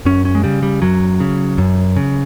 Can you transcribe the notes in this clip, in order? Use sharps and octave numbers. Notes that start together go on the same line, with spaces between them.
F#2 C#4
C#4
G#3
C#3 G3
G3
F#2 F#3
C#3
F#2
C#3